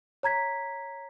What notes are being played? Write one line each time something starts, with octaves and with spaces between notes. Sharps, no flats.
C#5 A#5 G#6 B6